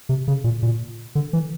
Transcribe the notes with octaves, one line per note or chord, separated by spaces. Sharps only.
C3
C#3
A#2
A#2
D3
E3